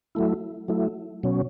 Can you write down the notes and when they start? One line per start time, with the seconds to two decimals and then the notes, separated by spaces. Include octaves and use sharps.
0.15 F#3 A3 E4
0.68 F#3 A3 E4
1.23 B2 F#3 C#4